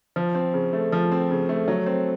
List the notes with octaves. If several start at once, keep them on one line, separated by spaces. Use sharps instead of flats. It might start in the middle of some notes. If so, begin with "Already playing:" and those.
F3
C4
C#3
A3
F3
C4
C#3
A3
F#3
C4